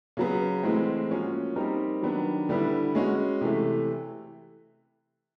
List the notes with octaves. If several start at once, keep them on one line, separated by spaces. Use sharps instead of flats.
C#3 F#3 B3
A2 E3 G#3 C4
F3 A#3 C#4 F#4
G3 C4 D#4 G4 A#4
D#3 F#3 B3 D4
D3 G3 B3 E4
G#3 C#4 F#4
C3 E3 A3